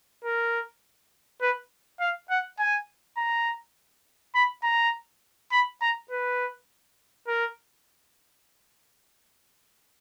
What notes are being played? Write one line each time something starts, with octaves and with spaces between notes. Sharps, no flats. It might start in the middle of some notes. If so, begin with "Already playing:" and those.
A#4
B4
F5
F#5
G#5
A#5
B5
A#5
B5
A#5
B4
A#4